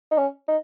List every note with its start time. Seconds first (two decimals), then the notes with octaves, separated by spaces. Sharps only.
0.11 D#4
0.18 C#4
0.48 D#4